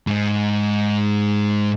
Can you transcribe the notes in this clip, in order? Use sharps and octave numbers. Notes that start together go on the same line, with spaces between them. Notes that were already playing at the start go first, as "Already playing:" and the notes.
G#2 G#3